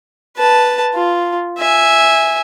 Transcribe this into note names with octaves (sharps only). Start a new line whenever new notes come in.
B4 A5
F4
E5 G#5